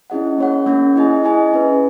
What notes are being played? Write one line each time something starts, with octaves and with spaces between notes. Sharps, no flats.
C#4 E4 G#4 D#5 F#5
A#3 C#4 G#4 C#5 F#5
A#3 C#4 G#4 C#5 F#5
E4 G#4 D#5 G#5
E4 G#4 D#5 G#5
C#4 G#4 B4